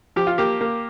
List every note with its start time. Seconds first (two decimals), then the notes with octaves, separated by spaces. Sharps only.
0.16 F3 G4
0.27 F4
0.38 A#3 G4
0.61 A#3